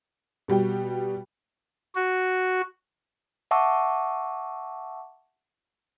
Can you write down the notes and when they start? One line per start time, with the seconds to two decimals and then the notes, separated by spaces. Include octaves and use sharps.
0.48 B2 G3 F#4 G5
1.95 F#4
3.51 E5 F#5 A5 C#6 D6 E6